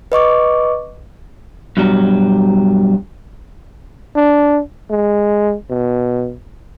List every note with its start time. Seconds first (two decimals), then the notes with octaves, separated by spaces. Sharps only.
0.12 B4 D#5 C#6 D6
1.77 G2 B2 F#3 G3
4.16 D4
4.90 G#3
5.69 B2